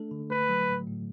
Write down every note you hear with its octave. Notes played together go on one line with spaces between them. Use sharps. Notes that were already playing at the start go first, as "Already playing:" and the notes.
Already playing: A3 D4 A4
D3
A3 B4
F#3
A2
A2